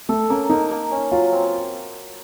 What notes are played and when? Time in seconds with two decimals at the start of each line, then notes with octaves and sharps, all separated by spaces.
0.09 A3 A4
0.30 A#3 C#4
0.50 A#3 D#4
0.71 A#3
0.91 C#4
1.12 F#3 F4
1.32 C4